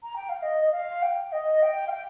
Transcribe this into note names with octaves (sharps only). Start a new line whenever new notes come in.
A#5
G5
F5
D#5
D#5
F5
G5
D#5
G5
F5
G5